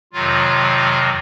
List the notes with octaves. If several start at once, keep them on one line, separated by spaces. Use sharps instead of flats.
F2 C3 D#3 F#3 F4